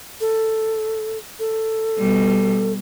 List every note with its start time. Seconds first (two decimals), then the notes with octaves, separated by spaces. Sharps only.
0.21 A4
1.40 A4
1.98 B2 G3